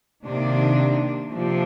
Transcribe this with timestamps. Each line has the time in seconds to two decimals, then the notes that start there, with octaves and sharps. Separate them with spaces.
0.24 C3 D#3 A#3 D4
1.31 C3 F3 A#3 D4